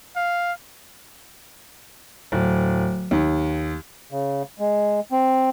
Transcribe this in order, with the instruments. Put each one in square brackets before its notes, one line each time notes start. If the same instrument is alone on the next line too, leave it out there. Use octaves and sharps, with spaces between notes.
[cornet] F5
[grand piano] D1
D#2
[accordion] C#3
G#3
C4